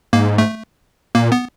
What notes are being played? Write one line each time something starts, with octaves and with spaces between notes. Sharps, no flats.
G#2 A#3
A3
A#2 A#3
B3